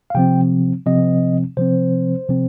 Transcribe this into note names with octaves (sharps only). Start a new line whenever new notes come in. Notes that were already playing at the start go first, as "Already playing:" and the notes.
F5
C3 F3 C4 G5
C3 F3 C4 D#5
C3 F3 C4 C5
C3 F3 C4